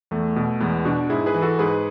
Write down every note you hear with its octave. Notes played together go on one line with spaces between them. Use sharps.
E2 A3
B2
E2 G#3 B3
B2 D4 F#4
G#2 E4 G#4
G#4 B4
E3
F#4 A4
G#2 G#4 B4